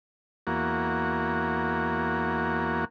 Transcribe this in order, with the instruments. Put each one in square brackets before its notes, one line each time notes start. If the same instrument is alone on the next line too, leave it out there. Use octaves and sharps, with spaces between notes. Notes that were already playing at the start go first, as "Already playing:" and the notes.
[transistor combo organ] E2 A#3 F#4